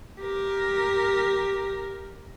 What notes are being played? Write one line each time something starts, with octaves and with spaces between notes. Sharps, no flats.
G4 A#4